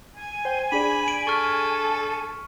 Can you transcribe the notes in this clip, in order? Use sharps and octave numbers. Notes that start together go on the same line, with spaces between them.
G#5
C5 G5 G6
D4 G#4 D5 B5
D7 F#7
A4 C#6 F6 B6